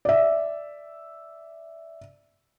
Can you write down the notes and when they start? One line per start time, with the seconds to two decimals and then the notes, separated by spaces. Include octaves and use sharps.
0.05 D5 E5